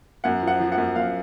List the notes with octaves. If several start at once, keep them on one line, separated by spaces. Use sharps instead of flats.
F#2 F#5
F3
F#5
F3
F#5
F#2
F#2 F5